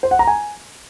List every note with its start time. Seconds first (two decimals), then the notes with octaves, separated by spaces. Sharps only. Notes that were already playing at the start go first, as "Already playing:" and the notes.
0.03 C5
0.11 F#5
0.19 A#5
0.27 G#5